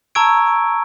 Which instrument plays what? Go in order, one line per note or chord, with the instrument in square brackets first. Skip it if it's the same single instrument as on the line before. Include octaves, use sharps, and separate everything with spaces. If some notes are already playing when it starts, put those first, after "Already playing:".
[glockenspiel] A5 A#5 C#6 E6 G#6 D7